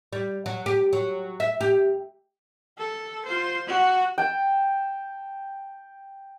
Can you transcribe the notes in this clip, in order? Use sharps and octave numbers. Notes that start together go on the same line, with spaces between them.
G3
F#3
G4
F#3
E5
G4
A4
F4 C5
F#4
G5 A5